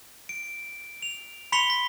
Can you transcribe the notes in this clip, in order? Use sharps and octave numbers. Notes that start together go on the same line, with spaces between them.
D7
F7
B5 C6 B6 C#7 F7 G7
B6